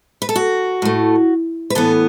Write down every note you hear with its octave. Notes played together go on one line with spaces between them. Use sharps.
B4
A4
F#4
A2 A3
B4
A2 E3 B3 A4